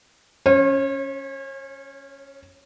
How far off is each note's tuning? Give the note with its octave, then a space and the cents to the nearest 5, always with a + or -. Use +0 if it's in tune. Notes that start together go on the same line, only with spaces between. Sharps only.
C#4 +0 C#5 -40